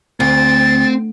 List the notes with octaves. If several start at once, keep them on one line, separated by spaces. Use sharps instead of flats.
D2 C4 A6